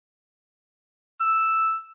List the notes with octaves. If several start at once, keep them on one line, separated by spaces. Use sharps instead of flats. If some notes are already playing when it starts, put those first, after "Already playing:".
E6